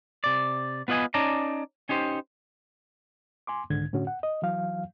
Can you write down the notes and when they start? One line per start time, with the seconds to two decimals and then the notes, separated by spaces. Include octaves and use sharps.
0.24 C3 D5
0.88 B3 F4 B4 D#5 G#5
1.14 C#4 D#4 D5 A5 A#5
1.89 C#4 D#4 G4 C5
3.47 G#5 C6 D6
3.70 C2 G#2 D3 D#3 G#6
3.93 A2 D3 C#4 F#4
4.07 F#5
4.23 D#5
4.42 E3 F#3 F5